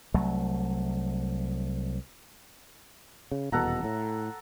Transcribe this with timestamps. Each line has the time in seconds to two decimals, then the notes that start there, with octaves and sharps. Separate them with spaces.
0.14 C2 F#3 A3
3.32 C#3
3.52 D#1 E2 B2 A4 F#5 A#5
3.84 A2